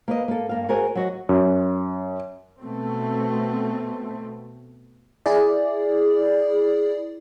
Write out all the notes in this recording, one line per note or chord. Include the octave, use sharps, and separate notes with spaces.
A#3 B4 D#5
A#3 A4
G2 A#3 F5
F#4 G#4 A#4 C5 G#5
F#3 F#4 D#5
F#2
B2 A3 C4
E4 G#4 D5